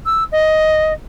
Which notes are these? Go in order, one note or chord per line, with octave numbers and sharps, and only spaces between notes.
E6
D#5